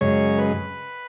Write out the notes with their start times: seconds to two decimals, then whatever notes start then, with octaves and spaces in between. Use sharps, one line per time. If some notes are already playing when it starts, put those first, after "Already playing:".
0.01 F#2 C#3 G#3 C#5
0.38 B4